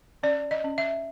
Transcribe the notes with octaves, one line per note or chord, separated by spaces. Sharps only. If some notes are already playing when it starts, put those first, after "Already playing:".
C#4 D5
D#5
C#4
E5